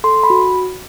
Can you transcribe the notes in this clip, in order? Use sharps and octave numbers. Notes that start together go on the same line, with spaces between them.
A4 C6
B5
F#4